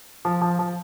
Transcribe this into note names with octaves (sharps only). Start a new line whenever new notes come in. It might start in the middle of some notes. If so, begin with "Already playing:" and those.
F3
F3
F3